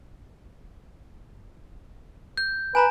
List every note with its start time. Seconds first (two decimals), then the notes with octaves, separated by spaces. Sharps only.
2.37 G6
2.75 B4 G#5 A#5 B5